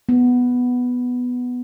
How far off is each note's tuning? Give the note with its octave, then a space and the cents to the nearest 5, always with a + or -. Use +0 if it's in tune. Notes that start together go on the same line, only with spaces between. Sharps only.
B3 +0